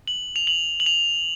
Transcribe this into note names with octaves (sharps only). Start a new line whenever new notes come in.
F#7
F7
F#7
F#7
F7